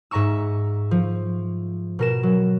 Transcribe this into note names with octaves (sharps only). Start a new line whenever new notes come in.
G#2 E5 A#5 C#6 E6
F3
B2 A#4 E7
F#3